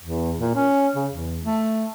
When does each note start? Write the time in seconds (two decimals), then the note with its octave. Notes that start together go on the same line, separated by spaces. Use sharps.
0.03 E2
0.40 A#2
0.55 C#4
0.95 C#3
1.12 E2
1.43 A3